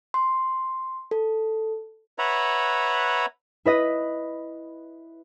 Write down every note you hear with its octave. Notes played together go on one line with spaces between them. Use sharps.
C6
A4
B4 C#5 E5 F#5 A#5 B5
E4 B4 D#5